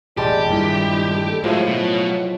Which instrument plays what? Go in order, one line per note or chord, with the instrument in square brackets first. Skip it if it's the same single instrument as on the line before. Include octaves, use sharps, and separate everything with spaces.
[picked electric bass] E1 A1 [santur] G3 G#3 A5 [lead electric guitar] G4 [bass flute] D5
[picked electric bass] G#1 G2 A#2 [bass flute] E4
[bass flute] A4
[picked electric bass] A2 [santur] F3 E5 [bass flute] F#3 [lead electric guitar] G#3 A#3
[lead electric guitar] B2 [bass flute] F#3